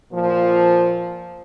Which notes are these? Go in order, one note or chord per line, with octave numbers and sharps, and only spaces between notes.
A#2 F3